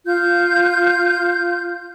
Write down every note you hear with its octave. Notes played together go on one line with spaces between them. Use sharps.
F4 G6